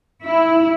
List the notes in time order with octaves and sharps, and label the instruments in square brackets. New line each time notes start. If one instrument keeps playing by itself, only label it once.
[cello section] E4